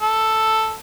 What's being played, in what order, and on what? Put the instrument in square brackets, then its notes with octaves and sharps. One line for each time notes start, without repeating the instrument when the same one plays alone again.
[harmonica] A4